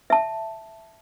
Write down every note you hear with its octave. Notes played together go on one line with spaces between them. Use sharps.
E5 A5